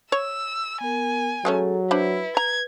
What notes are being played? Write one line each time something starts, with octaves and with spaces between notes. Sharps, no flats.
C#5 E6
B3 A#4 G#5
F#3 G#3 A3 C#4 G#4 A4 A#5
D4 E4 B4 C5 B5
A#5 G#6